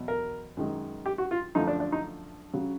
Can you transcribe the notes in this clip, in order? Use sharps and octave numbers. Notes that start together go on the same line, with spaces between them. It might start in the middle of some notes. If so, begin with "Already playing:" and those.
Already playing: E2 B2 F#3
A#4
F#2 D#3 G#3
G4
F#4
F4
F#2 D3 F3 A3 D#4
D4
D4
D#4
C#3 F#3